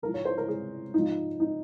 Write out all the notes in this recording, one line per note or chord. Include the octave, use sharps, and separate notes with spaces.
G#2 A#4
F3
C#5
C5
A#4
G#4
G#2 F3 D#4
D#4